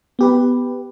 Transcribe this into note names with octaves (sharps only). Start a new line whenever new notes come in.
B3 G4 B4